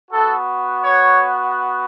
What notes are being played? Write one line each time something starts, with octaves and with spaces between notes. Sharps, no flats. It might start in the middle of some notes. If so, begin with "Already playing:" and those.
B3 F#4 A4
C#5